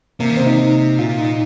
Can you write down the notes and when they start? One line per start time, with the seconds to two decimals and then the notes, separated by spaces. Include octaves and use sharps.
0.20 C3 A#3
0.30 D#3
0.37 C3 C4
0.46 D#4
0.99 A#2 F4
1.19 D#4